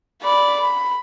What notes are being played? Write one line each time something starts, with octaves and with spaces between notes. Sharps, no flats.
D5 B5
B5